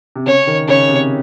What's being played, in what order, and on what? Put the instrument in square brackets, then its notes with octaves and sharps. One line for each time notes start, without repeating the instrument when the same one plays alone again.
[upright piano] C3
[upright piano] C#3 [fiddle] C#5
[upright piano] D#3
[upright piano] C#3 [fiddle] C#5
[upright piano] C3